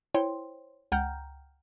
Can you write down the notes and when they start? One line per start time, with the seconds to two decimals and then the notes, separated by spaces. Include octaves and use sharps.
0.15 E4 C5 C#5 G5 C6
0.92 C#2 F#5 G5 A#5 F6 G6